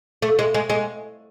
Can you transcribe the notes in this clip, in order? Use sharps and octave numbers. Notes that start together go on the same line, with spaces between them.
A3
G#3
G#3
G#3